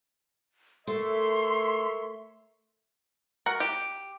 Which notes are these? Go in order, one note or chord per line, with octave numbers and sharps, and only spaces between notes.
A3 A#4 C#5 E5 C6
F#4 A#4 F#5
G4